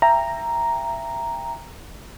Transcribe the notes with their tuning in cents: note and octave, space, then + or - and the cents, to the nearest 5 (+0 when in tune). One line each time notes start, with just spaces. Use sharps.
E5 +25 G5 +20 A#5 +0